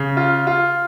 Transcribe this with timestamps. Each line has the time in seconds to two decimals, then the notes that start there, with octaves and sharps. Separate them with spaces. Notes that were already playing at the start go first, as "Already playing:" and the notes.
Already playing: C#3
0.17 F4
0.47 F4